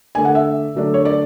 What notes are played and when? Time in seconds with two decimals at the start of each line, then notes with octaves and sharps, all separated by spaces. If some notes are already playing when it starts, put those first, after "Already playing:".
0.15 D3 A3 D4 G#5
0.25 F#5
0.35 E5
0.75 D3 F#3 A3 D4
0.94 C#5
1.05 D5